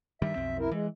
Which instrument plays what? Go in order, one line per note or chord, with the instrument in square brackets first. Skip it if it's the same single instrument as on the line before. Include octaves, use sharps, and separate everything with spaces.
[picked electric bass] G2 D#3 G3 [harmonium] E5
[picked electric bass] B1 F2 C4
[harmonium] E4 A#4
[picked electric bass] E3 [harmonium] G#3